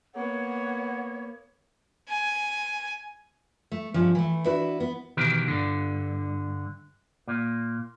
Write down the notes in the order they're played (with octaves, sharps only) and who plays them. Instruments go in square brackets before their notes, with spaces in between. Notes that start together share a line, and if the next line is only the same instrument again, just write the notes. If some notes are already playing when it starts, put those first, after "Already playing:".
[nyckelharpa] A#3 B3 [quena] C#5 [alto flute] F#5
[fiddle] G#5
[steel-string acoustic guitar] A3
G2 F3 A3 C#4
E3 A3
D4 E4 F#4 B4
B3
[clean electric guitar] B2 D#3 E3 G4 A#4
G2 D3
A#2